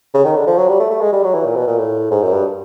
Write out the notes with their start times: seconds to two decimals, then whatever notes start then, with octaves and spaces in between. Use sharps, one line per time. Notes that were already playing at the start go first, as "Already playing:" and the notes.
0.14 C#3
0.25 D#3
0.36 D3
0.47 F3
0.58 F#3
0.69 G3
0.80 A3
0.91 A3
1.01 G#3
1.13 G3
1.24 F#3
1.34 E3
1.45 A#2
1.56 B2
1.67 A#2
1.78 A2
2.11 G#2
2.23 F#2
2.33 G2